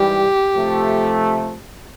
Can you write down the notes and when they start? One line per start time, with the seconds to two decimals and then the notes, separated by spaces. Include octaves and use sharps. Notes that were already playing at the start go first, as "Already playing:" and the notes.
Already playing: G#2 E3 G3 G4
0.54 C3 F3 A3